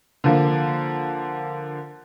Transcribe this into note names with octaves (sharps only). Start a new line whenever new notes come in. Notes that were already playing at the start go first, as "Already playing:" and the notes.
D3 F3 A#3